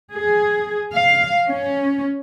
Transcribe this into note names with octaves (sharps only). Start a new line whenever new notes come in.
G#4
F5
C#4